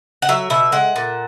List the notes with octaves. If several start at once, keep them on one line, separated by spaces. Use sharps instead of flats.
F#5
F#3 E5
B2 E5
G#3 F#5
A#2